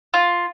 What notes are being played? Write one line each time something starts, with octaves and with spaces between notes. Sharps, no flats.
F4